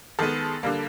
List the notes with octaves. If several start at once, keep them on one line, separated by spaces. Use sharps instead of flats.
D#3 G#3 B3 A4
D3 G3 A#3